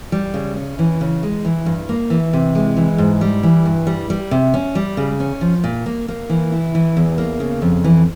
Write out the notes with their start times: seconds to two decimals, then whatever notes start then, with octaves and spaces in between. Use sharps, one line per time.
0.12 G3
0.34 C#3
0.56 C#4
0.79 E3
1.01 C#3
1.23 G#3
1.45 E3
1.66 G2
1.89 A#3
2.10 E3
2.33 C3
2.55 G#3
2.77 E3
2.98 G#2
3.21 G3
3.43 E3
3.66 G2
3.87 G3
4.10 G3
4.31 C3
4.54 C#4
4.75 G3
4.97 C#3
5.20 C#4
5.41 F3
5.64 A#2
5.86 A#3
6.08 A#3
6.30 E3
6.52 E4
6.75 E3
6.97 E2
7.18 A#3
7.40 C#3
7.62 F2
7.84 E3